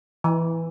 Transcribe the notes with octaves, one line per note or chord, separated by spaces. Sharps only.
E3